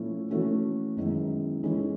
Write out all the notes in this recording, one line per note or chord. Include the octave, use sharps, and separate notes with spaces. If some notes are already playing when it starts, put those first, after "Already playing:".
Already playing: A#2 F3 A3 C#4 E4
E3 A3 C#4 F#4 A4
F#2 D#3 G#3 B3 E4
E3 G#3 C#4 E4 G#4